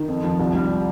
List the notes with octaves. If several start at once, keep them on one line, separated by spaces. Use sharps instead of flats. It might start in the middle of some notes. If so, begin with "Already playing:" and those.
Already playing: D#3
F2
F3
C2
G3